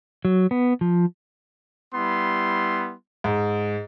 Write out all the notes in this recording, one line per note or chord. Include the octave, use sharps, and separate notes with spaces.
F#3
B3
F3
G3 B3 E4 C6
G#2